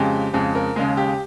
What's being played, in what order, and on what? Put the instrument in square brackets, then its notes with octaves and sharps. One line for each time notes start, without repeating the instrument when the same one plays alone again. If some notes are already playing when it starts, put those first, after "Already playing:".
Already playing: [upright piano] F2 C#3 G#3 G4
F2 C#3 G#3 G#4
A#4
D#2 C#3 G#3 G#4
G4